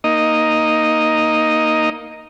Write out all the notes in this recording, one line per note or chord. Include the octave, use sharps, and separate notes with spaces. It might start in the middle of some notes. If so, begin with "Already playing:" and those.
A#3 D#4 D#5